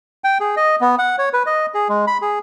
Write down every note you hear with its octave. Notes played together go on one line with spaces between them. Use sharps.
G5
G#4
D#5
B3
F#5
C#5
B4
D#5
G#4
G#3
B5
G#4